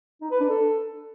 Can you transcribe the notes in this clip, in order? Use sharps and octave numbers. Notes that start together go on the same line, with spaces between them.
D#4
B4
D4
A4